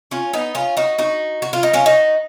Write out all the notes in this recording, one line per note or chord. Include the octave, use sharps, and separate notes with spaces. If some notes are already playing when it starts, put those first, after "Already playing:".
C#4 F4
B3 D#4
C#4 F4
D#4 F#4
D#4 F#4
F#4
F4
D#4
C#4 F4
D#4 F#4